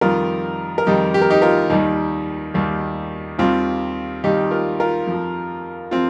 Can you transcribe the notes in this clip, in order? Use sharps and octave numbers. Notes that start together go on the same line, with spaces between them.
F2 D#3 G3 F4 A#4
A#4
F2 D#3 G3 D#4 G4
G4
A#4
D#4 G4
F4 A#4
D#2 D#3 G3 D#4
D#2 D#3 G3
D#2 D#3 G3 C4 F4
D#2 D#3 G3 D#4 G4
F4 A#4
F4 A#4
F2
F3
F3 C4 F4